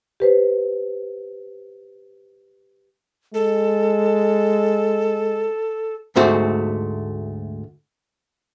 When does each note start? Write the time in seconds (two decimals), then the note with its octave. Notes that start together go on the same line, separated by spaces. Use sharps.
0.20 G4 B4 C5
3.34 G#3 A4
6.16 D2 G#2 A3 F#4 C5